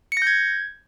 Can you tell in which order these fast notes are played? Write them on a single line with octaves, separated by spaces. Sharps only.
C#7 A#6 G6 G#6